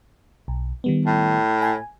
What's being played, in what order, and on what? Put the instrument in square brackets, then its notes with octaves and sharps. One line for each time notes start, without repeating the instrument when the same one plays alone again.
[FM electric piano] B1
D#3 G3 B3
[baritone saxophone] A2
[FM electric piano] G#5